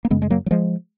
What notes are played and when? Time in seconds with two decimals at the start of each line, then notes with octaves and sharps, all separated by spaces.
0.05 A#3
0.10 F#2 C#3 G#3 B3
0.22 G#3
0.30 F#3 A#3
0.46 F#3
0.51 F3 G#3